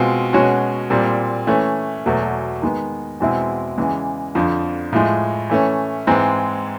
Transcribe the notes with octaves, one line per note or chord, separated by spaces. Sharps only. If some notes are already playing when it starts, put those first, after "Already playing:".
Already playing: B2 G#3 C4 F4
B2 G#3 C#4 F#4
A#2 G3 C4
E3 A3 C#4
E2 B2 F#3 A3
D#3 G#3 B3
E2 B2 G#3 C4 E4
E2 C#3 E3 G#3
F2 D3 F3
A2 F3 G#3
E3 A3 C#4
G#2 E3 G#3 C4